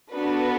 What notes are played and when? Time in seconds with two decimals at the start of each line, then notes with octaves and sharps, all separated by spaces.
0.11 B3 D4 F#4 A4 B4